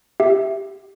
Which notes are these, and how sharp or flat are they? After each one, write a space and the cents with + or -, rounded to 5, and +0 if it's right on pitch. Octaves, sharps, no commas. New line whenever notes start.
G4 +0 E5 +0